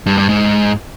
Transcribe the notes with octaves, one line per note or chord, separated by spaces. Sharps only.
G2
G2
G#2